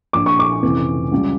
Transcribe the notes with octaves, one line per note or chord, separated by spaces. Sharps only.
A#1 A#2 F3 D6
C#6
D6
F1 F2 C#3 E3
C#2 C#3 G3